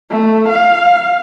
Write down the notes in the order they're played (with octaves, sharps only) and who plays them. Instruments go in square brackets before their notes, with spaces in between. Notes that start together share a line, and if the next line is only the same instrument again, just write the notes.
[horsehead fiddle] A3
F5